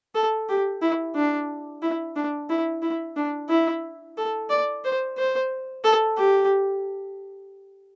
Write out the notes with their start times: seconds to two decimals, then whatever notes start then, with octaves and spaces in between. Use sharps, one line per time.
0.15 A4
0.49 G4
0.82 E4
1.16 D4
1.82 E4
2.16 D4
2.50 E4
2.83 E4
3.17 D4
3.50 E4
4.18 A4
4.50 D5
4.84 C5
5.18 C5
5.84 A4
6.17 G4